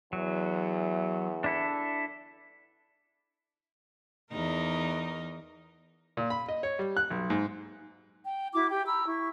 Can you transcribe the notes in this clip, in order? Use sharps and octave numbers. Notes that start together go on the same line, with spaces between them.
E2 F#3
D4 E4 A4
E2 D#4 A#4
A#2
B5
D#5
C#5
G3
F#6
B1
G#2
G5
E4 F#4 D6
G4 G5
A#5 B5 E6
E4 C#6